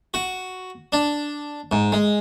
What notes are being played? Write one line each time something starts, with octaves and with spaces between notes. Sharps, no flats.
F#4
D4
G#2
G#3